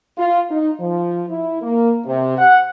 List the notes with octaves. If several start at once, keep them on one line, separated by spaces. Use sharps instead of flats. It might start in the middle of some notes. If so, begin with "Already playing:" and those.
F4
D#4
F3
E4
A#3
C3
F#5